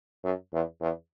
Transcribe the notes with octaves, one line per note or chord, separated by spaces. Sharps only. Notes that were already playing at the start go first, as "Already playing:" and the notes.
F#2
E2
E2